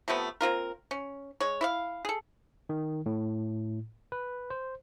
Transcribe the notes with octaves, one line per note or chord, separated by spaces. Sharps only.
C3 F3 A3 B3
A#3 C4 F4 A#4
C#4
G#3 C#5
E4 C#5 F5
G#4 A4
D#3
A2
B4
C5